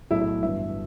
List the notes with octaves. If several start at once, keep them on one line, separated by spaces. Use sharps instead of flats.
B1 A2 F#3 A3 E4
E4
G1 G2 E3 E5